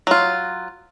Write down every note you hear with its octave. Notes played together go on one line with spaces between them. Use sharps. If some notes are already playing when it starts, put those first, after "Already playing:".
F#3 F4